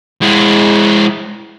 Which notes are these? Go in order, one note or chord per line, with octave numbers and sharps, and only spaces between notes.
G#3 E4